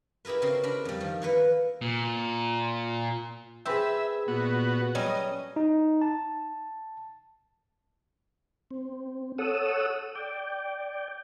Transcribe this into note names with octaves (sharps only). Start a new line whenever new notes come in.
E4 G4 G#4 A#4 B4
C#3 C4 A#4
D4 A#4 B5
F2 G3
D#3 F3
E3 A#3 B4 F#5
A#2
C4 G4 G#4 B4 E5 E6
A#2 B3 F#4
F#3 G3 C#4 D#5
D#4
A5
C4
A4 C#5 F#5 D#6 E6
D5 G5